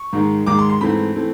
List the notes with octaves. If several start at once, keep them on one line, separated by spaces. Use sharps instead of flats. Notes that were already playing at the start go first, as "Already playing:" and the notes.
Already playing: C#6
G#2 D#3 G#3
G#2 D#3 G#3 D6
C6
C6
G#2 E3 A3 C4 B5
E3 A3 C4